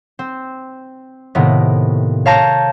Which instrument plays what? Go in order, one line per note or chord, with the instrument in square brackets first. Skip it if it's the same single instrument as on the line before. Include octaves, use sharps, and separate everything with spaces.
[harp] C4
A2 C3 D#3 A#3 B3
C#5 F5 A5 A#5 G6 A#6